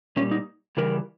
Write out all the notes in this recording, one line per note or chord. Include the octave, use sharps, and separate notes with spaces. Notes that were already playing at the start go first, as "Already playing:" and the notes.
A#2 G3 C#4
D#4
C#3 E3 G3 A#4